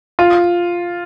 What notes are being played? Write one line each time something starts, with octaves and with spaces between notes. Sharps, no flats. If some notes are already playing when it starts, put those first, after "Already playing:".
F4